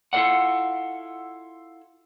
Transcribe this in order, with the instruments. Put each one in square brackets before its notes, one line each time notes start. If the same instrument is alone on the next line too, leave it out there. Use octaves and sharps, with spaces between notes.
[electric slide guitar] E4 F4 A4 A#4 D5 F#5